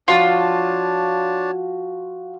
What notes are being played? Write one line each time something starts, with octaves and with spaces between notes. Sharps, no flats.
F3 D4 F4 F#4 C#5 A5